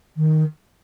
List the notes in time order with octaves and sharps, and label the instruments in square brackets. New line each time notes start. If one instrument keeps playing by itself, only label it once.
[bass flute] D#3